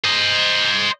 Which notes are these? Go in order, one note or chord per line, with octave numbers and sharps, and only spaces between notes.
C5 D#5